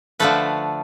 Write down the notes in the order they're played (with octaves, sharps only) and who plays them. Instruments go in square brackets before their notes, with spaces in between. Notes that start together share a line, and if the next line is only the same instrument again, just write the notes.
[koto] D3 F3 A3 B4